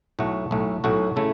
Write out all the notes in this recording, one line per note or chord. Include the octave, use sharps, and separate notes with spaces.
B1 A2 A3 F#4
B1 A2 A3 F#4
B1 A2 A3 F#4
C#3 A3 E4 A4